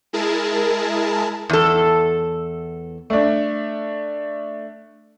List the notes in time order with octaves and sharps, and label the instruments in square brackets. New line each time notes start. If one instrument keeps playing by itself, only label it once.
[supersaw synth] G#3 E4 G#4 A#4 A5
[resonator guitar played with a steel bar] E2 A4
[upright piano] A3 D4